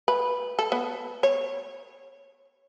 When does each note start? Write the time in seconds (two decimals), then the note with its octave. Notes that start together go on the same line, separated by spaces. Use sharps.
0.08 B4
0.59 A4
0.72 B3
1.23 C#5